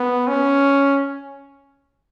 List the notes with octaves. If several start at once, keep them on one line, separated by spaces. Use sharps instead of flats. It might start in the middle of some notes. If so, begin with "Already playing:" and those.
Already playing: B3
C#4